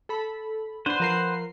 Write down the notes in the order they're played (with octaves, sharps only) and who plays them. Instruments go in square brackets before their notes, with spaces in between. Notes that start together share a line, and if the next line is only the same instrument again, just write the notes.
[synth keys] A4 B5
[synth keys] D4 C6 [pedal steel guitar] B4 C5 F#5
[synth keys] F3 A#4 C7